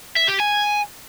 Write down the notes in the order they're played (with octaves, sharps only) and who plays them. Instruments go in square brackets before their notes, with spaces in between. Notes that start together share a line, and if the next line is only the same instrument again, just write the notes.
[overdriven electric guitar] E5
G4
G#5